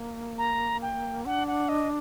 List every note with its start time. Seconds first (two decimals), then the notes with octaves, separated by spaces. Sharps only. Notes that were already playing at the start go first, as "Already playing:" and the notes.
Already playing: A#3
0.38 A#5
0.82 G5
1.25 D4 F#5
1.48 F#5
1.69 D#5